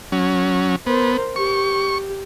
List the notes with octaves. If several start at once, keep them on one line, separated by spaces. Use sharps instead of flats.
F#3 C#4
B3 A#4 C5
G4 C#6